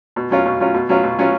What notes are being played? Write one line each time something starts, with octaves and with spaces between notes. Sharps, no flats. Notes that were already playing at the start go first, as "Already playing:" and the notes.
B2
F#3 C#4 F4
B2
F#3 C#4 F4
B2
F#3 C#4 F4
B2
F#3 C#4 F4